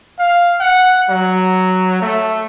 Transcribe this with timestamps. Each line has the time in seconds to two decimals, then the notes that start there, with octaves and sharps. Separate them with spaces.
0.19 F5
0.61 F#5
1.10 F#3
2.02 A3